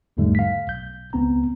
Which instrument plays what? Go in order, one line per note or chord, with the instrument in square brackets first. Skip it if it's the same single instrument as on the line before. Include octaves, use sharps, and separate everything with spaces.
[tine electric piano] A1 E2 G#2 D3 G3 A3
F5 B6
B1 G6
C#2 B3 C4 A#5